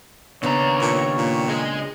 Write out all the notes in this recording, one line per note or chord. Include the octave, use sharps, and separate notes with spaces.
D#2 C#3 B3 D4 C#5 A#5
A#2
A#2
G#4 D#5